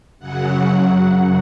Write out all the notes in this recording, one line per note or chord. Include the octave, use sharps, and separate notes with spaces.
F#2 C#3 F#3 F#5